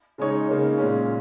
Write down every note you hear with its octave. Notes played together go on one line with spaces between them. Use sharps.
C#3 G#3 D#4 C#5
C#3 A#3 D#4 C#5
A#2 G#3 C#4